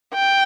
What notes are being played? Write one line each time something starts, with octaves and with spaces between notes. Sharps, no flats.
G5